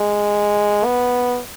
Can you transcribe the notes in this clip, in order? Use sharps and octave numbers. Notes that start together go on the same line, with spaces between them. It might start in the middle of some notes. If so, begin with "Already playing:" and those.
Already playing: G#3
B3